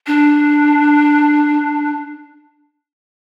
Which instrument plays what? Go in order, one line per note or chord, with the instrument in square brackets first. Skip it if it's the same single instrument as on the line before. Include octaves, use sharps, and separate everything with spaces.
[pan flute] D4